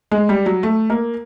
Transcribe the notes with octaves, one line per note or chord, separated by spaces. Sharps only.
G#3
G3
F#3
A3
A#3